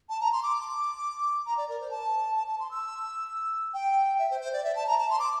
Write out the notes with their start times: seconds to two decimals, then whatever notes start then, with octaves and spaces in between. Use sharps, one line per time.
0.09 A5
0.21 A#5
0.32 C6
0.43 D6
1.46 A#5
1.57 D5
1.69 A#4
1.80 C5
1.91 A5
2.36 A5
2.48 A5
2.60 C6
2.71 E6
3.74 G5
4.19 E5
4.31 C5
4.41 C5
4.53 D5
4.64 E5
4.76 A5
4.87 A#5
4.98 A5
5.10 C6
5.19 D6